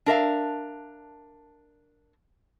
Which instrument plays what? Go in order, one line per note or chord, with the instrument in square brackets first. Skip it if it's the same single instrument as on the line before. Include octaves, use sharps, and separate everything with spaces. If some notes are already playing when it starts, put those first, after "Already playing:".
[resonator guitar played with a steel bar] D4 A#4 E5 F5